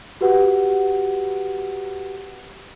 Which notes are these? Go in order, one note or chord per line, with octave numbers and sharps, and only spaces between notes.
F#4 G4 B4 F#5